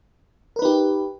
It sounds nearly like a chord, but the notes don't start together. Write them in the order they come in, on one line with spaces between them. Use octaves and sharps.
A#4 B4 D#4 G4